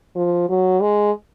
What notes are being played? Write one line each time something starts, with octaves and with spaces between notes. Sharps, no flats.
F3
F#3
G#3